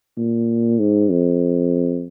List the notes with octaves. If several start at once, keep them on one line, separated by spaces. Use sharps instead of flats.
A#2
G#2
F2